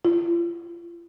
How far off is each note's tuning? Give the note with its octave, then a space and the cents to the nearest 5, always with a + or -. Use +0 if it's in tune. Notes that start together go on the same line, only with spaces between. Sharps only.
F4 -35